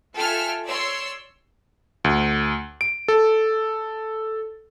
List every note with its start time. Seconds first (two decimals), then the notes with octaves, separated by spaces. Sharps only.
0.15 F4 A4 E5 G5 G#5 F6
0.66 C#5 D5 C6 E6
2.04 D2
2.81 D7
3.08 A4